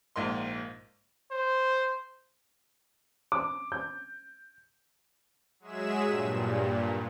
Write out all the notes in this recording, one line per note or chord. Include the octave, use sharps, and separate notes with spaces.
A#1 G#2 A#3 C6
C5
D6
G6
F#3 G#3 G#4 E5 E7
G2 A#2